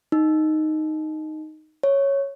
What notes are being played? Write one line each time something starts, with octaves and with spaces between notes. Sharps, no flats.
D#4
C#5